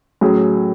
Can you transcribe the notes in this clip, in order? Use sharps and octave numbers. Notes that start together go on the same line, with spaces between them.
A2 F#3 C#4 G#4